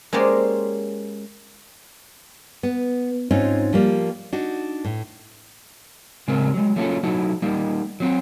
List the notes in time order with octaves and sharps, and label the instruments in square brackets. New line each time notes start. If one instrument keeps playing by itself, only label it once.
[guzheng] G#3 A#3 C#4 G4 C5 D5
[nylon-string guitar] B3
G#2 C4 C#4 D#4 F4
F3 G3 A#3
D4 D#4 F#4
A2
[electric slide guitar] A2 C#3 G#3 C4 A#4
F#3 G#3
F#3 A3 A#3 C#4 F4 A4
F#3 D#4 E4 F#4 A4
G3 A#3 D#4
F#3 C4 F#4